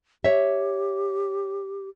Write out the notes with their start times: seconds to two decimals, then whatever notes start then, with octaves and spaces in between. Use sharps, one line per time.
0.24 G4 C#5 E5